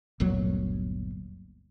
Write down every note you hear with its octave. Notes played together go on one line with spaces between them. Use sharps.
G1 D2 A#2 F#3